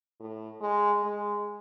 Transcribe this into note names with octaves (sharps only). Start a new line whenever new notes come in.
A2
G#3
G#3